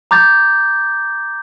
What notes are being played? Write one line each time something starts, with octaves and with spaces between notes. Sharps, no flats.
A#5 D6 G6 A6